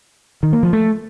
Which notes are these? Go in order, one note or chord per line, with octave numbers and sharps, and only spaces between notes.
D#3
A#3
F3
A3